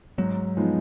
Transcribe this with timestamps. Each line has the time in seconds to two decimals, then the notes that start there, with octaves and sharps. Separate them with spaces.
0.18 G#2 F#3
0.57 F3 G#3 B3 D#4